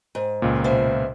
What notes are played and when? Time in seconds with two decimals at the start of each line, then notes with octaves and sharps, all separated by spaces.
0.15 G#2
0.42 C#2 A#2
0.64 B2 C5 E5